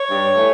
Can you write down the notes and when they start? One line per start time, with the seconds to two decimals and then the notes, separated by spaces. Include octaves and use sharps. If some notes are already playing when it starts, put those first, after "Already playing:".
Already playing: C#5
0.10 G2
0.36 E3 A3